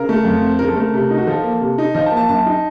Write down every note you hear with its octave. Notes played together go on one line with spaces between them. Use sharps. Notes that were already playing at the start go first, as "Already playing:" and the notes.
Already playing: C#3 A#4
A3
F2
C4
C#3 A#4
A4
A3 A#4
C3
D#4
F#4
F3 A4
A#3
C3
D#4
F3 D#5
A5
A#3
A5
F#2 A5
D#4